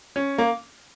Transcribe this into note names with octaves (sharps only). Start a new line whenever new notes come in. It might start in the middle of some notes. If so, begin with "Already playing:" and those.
C#4
A#3